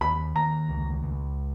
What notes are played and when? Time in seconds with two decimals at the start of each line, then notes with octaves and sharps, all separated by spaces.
0.01 D#2 B5
0.35 D#2 A#5
0.69 C#2
1.03 C#2